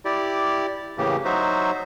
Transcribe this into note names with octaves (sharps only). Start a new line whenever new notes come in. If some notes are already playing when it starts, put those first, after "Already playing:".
E4 G4 D5
A2 C#3 E3 A#3 G4
F#3 D#4 F#4 C5 E5